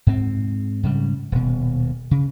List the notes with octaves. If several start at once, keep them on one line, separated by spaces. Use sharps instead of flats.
G#2 C4
G#2 C#3 G3
D#1 B2
C#3